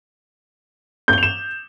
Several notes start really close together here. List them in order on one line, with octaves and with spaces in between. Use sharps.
G6 G7 F7 E7